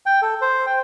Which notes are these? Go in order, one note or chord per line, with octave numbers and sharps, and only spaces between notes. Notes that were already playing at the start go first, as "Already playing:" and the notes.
G5
A4
C5
G5